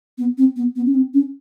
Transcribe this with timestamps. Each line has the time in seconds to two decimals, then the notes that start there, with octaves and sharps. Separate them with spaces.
0.18 B3
0.38 C4
0.56 B3
0.76 B3
0.86 C#4
0.95 C4
1.14 C#4